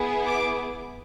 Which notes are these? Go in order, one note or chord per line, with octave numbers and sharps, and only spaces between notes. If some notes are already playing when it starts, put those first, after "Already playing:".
Already playing: B3 E4 G#4
D6